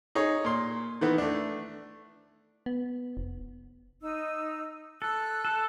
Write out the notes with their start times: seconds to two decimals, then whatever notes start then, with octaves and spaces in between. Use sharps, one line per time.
0.15 D#4 G#4 C#5
0.44 A#2 C6
1.01 D#3 E3 B3
1.18 A3 D4
2.66 B3
3.17 F1
4.01 D#4 E6
5.02 A4 E6 F#6
5.45 A4